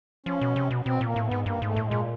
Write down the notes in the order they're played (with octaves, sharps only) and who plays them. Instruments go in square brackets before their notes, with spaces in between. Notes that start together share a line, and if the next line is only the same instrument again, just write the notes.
[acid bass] F3 [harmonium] C#4
[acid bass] B2
C3
B2
[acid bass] B2 [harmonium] C4
[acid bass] A#2
[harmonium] A#3
[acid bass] A2
[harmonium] B3
[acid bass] G#2
[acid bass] G2 [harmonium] A#3
[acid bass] G#2 [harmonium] A3
[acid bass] A2
[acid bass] A#2 [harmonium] G#3